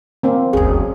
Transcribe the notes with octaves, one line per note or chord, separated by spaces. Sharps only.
A#3 C4
F#1 D2 G#4